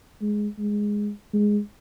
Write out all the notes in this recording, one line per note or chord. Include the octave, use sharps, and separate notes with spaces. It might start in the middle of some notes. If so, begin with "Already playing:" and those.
G#3
G#3
G#3